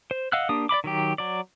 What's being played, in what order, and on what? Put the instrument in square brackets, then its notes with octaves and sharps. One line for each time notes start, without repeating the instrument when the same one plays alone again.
[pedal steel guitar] C5
D#5 F5 F#5 E6 F#6
A#3 D4 G4 D#6
D5 D#5 B5 D6
D#3 F#3 G4
F#3 D5